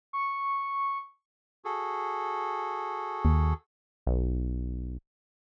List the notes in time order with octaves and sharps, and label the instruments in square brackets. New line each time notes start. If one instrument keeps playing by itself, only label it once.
[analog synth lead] C#6
[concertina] F#4 G#4 A4
[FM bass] D#2
[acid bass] B1